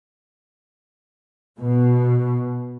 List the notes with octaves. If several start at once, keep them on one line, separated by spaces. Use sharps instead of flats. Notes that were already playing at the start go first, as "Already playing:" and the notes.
B2